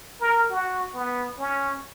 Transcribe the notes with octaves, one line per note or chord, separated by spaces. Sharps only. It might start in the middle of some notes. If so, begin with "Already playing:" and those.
A#4
F#4
B3
C#4